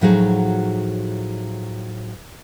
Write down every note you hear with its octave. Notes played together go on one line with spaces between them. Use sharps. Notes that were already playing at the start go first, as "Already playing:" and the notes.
A2 F3 F#3 D#4 F#4 G#4